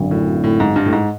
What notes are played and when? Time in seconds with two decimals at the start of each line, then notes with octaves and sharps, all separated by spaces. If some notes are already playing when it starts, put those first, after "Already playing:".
Already playing: G#1 F#2 D3
0.11 A2
0.44 A2
0.60 G#2
0.76 G2
0.86 A2
0.92 G#2